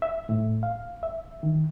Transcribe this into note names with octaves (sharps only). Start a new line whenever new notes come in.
E5
A2
F5
E5
D#3